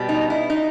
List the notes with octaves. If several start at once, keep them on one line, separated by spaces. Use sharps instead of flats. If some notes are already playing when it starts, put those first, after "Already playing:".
Already playing: B2 G3
D#4
E4
D#4